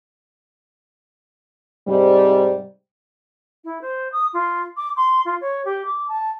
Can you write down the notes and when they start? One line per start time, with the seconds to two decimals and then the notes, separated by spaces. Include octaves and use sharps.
1.88 G#2 C3 G3
3.64 E4
3.81 C5
4.12 D#6
4.33 F4
4.77 D6
4.97 C6
5.25 F4
5.41 C#5
5.65 G4
5.85 D6
6.08 A5